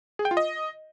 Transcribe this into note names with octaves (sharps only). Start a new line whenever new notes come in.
G#4
G5
F4
D#5